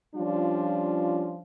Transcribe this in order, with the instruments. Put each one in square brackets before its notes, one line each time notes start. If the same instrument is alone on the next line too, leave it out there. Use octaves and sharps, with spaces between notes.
[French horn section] F3 G3 C#4 D4 F4